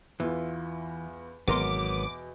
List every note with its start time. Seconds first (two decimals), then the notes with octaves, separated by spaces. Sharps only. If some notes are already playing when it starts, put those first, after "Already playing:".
0.20 E2 E3 B3 F4
1.48 G#1 E2 B2 F#3 B3 A#4 C6 D6